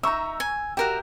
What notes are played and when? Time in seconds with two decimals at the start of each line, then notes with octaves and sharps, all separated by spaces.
0.03 D#4 E5 A#5 C#6 E6
0.40 G#5
0.77 F#4 G4 A#4 E5